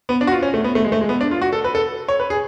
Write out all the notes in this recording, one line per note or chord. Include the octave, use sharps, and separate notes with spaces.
B3
D4
F#4
F4
C#4
A3
B3
A3
G#3
A3
G#3
B3
D4
F4
F#4
A4
B4
A4
C#5
B4
G#4